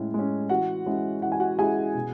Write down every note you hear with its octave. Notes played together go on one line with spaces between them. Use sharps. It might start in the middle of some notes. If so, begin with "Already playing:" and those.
Already playing: A2 G#3 C#4
G#3 C#4
E3 F#4 F#5
G#3 C#4 E4
E3 F#5
G#5
F#4 F#5
G#3 C#4 E4 G#4 G#5
B2